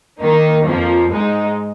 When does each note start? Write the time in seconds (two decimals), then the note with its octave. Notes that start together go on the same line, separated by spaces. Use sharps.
0.21 D#3 A#3 D#4
0.66 F2 F3 A#3
1.11 G#2 G#3 D#4